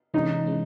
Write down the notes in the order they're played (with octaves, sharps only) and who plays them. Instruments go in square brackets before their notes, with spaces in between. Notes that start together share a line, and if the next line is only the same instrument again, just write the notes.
[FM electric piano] C3 E3 G#3 C#4 [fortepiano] D#4
[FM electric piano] E3 G#3 C#4